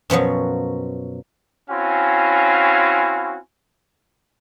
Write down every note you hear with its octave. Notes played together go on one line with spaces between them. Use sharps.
F#2 B2 F3 F#3
C4 C#4 E4 F#4 F5 G#5